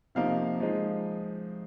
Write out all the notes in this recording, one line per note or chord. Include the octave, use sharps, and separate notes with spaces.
C3 F3 A#3 D#4 F5
F3 G#3 D#4